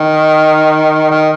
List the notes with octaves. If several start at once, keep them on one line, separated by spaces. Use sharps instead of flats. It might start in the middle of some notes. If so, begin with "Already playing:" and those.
Already playing: D#3
D#3